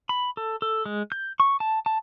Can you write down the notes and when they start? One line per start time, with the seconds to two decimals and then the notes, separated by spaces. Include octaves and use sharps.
0.09 B5
0.37 A4
0.62 A4
0.86 G#3
1.12 G6
1.40 C#6
1.60 A5
1.86 A5